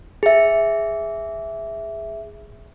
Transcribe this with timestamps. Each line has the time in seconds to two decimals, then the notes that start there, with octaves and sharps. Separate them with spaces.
0.23 G#4 E5